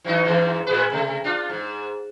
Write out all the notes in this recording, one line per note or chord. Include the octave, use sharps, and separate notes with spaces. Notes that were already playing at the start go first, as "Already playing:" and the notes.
E3 F#3 D#4
F2 G#2 E3
A2 G#4 B4
C3 A3
D4 F4
G#2